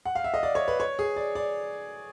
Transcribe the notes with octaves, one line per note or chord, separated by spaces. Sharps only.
F#5
F5
E5
D#5
D5
C#5
B4
C#5
G#4
D5
D5